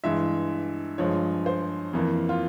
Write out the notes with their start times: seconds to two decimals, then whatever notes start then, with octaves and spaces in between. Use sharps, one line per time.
0.04 G2 E3 G#3 E5
0.98 G2 F3 G#3 C#5
1.46 C5
1.93 F2 E3 A#3
2.29 F4